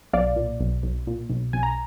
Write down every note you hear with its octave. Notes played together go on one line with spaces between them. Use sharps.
B1 D5 F5
A#2
B1
B1
A#2
B1
B1 G#5
A#5